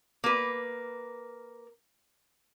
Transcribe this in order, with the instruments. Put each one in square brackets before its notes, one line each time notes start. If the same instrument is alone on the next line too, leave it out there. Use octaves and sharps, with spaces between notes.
[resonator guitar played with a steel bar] A#3 B4